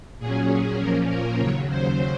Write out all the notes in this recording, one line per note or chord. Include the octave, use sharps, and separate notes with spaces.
A#2 F#3 C#4 G#4
A#2 F3 A#3 C#4 A#4
A#4
D#2 C#3 F#3 C#5
C5